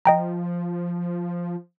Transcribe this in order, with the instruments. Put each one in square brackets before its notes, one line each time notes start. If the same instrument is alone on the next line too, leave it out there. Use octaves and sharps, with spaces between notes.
[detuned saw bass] F3 [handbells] D#5 G5 A#5